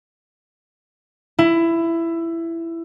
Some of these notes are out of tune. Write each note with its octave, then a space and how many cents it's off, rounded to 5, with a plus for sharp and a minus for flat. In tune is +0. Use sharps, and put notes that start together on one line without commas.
E4 +15